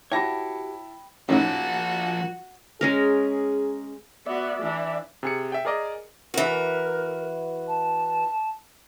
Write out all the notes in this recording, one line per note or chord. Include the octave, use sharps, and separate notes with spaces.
E4 F#4 G4 C#5 G5 A5 B5 A#6
F#2 A2 F3 A#3 D#4 F#4
G#3 C#4 G#4 A#4
B3 F#4 D5 E5
E3 D4
C3 G#4 C#7
E5 G5
G#4 A#4 D5 D#5
E3 F#4 A#4
A5